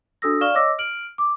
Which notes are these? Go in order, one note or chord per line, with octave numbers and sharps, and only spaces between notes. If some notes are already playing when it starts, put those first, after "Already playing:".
D4 F#4 A4 D#6 E6 A#6
D5 F5 C#6 F6 E7 G7
C#5 D#5 D6 E6 A#6
F6 D7 F#7
D6